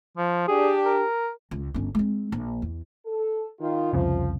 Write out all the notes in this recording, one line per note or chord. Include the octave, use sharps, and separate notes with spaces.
F3
D4 G4 G#4
A#4
C#2
G1 C#4
G#3 C4
A#1
E2
A4
D#3 F4
C2 F2 C#3 F3